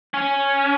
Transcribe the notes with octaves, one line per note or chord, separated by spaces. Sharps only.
C#4